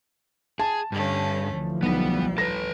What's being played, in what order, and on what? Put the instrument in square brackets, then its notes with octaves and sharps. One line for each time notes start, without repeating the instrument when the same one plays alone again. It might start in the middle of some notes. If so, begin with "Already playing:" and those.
[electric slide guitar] G#4 [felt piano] A5
[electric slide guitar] G2 [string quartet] D3 A3 C#4
[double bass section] D2 E3 F3
[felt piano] B1 [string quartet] G3 [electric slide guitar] B3 B4
[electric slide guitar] A4 B4 [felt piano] A#6